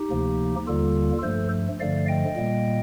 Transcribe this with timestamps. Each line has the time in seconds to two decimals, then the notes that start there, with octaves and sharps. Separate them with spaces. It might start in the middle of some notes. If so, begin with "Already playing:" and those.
Already playing: D#4 G4
0.10 D2 C3 F3 A#3
0.67 D#2 D3 G3 A#3 F4 A4
1.23 G2 F3 A3 A4 C5
1.80 G2 D3 F3 A3 D5 F5
2.08 D#5 G5
2.36 A#2 G3 A#3